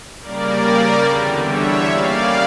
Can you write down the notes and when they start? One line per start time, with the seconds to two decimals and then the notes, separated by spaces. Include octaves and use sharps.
0.21 C#3 G3 A#3 A#4 D5
1.04 E2 D3 G3
1.46 C#5 E5
1.87 C#3 G3 A#3 D5 F5